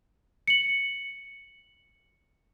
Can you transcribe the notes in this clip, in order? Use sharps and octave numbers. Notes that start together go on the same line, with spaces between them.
C#7 F#7